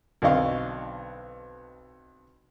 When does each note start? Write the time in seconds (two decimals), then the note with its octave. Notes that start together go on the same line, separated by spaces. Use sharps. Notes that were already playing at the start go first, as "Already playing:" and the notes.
0.22 B1 D3 C4 D#5 F5 C#6